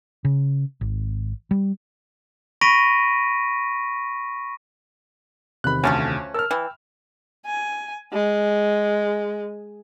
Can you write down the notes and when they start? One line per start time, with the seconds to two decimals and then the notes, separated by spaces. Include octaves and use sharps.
0.25 C#3
0.81 G#1
1.51 G3
2.61 B5 C#6 A#6 B6 D7 D#7
5.64 E2 C3 D#3 B5 F#6
5.84 D2 F3 A3 C#4
6.34 A#4 A5 E6 F6
6.51 E3 G5
7.46 G#5
8.13 G#3